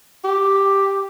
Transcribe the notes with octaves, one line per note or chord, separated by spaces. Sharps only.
G4